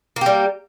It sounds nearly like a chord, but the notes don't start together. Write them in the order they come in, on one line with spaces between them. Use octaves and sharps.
A#3 G4 G3